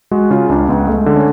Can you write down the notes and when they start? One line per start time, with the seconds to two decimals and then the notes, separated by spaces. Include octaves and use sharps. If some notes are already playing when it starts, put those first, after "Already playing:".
0.11 G#3 F#4
0.30 C#3 F4
0.49 C#2 D4
0.68 C#2 B3
0.87 G#3 A3
1.06 D3
1.16 C#4